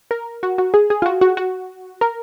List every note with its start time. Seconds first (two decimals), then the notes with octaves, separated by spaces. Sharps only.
0.11 A#4
0.43 F#4
0.58 F#4
0.74 G#4
0.90 G#4
1.02 F4
1.06 F#4
1.21 F#4
1.37 F#4
2.01 A#4